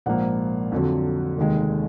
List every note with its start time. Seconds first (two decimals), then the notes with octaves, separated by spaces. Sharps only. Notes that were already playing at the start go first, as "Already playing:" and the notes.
0.06 A#1 G#2 F3 A#3 F#5
0.72 F2 D3 F#3
1.37 F1 D#2 D#3 G#3